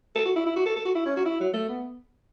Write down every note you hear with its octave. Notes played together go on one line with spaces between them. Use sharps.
A4
F#4
E4
E4
F#4
A4
A4
F#4
E4
C#4
F#4
E4
F#3
A3
B3